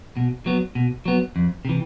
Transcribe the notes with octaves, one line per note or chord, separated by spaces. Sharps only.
B2
F#3 B3
B2
F#3 B3
F2
C3 E3